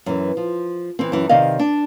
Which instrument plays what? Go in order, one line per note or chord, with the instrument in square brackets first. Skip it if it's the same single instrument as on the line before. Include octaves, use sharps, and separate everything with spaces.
[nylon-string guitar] F#2 E3
F3
E3 C4
F#2 E3
C3 D#3 D5 D#5 F5
D4